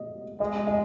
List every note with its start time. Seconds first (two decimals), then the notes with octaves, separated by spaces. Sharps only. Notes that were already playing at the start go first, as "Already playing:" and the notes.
Already playing: D#5
0.40 G#3 D#5
0.67 D#5